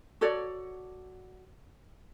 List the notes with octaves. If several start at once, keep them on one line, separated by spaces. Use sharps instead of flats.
F#4 A4 C#5 D5